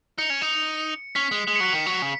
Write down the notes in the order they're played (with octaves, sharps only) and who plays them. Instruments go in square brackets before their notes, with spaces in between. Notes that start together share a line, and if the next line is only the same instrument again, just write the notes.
[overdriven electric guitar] D#4 [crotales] C#7
[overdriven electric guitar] C#4
D#4
[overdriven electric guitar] C#4 [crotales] B6
[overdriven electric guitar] G#3
G#3
[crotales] C#7
[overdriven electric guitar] F#3 [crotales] B6
[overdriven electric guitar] D#3
F#3
C#3